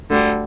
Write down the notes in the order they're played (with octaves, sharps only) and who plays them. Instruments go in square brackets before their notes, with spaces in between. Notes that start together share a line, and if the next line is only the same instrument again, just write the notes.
[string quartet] D2 D3 G3